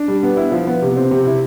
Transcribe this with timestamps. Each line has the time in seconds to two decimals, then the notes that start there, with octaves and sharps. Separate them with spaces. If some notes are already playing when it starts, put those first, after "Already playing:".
Already playing: D4
0.08 G3
0.23 B3
0.37 E4
0.52 F3
0.67 B3
0.82 C3
0.97 C4
1.11 C3
1.26 E4